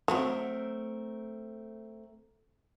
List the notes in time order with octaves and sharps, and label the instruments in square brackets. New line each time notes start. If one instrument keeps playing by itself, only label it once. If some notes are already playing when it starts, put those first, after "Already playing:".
[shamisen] F#3 [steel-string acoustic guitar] A3 C4 A#4